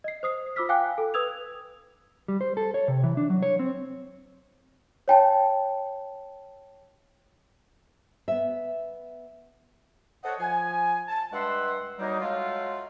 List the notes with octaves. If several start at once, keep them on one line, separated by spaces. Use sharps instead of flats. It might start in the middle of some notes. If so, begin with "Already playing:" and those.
D#5 C7
C5 D#6 C7
F4 C5 D6 E6 F6 B6
F5 G5 G#5 D6 F#6
A4
B4 D#6 E6 G#6 F7
G3
C5
A4
C#5
C3
E3
D4
F#3
C#5
C4
C#5 G5 A5
B3 E5
A4 C5 C#5 D#5 F#5
F3 G#5
A5
G2 G#3 E5 F#5 C6
F#3 G3 A#3 D#4
F#3 G#3 A3 F4